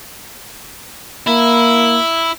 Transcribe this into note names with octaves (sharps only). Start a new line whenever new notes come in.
A#3 E4